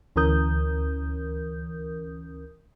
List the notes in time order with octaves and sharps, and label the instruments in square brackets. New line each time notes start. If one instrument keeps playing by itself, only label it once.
[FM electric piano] D2 E3 C#4 A#4 D#6 G6